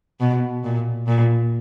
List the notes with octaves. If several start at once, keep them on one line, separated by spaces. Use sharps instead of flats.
B2
A#2
A#2